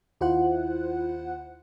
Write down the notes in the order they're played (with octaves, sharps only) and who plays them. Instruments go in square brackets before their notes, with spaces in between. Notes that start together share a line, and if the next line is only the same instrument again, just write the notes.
[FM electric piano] D#2 E4 F4 C5 F#5 F#6